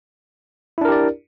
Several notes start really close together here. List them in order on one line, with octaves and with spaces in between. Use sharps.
E4 D4 A#4 G4 D5